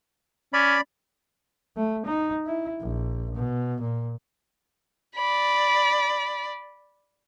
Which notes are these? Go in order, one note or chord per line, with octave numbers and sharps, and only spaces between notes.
C#4 D5 B5
A3
D#4
E4
A#1
B2
A#2
D5 B5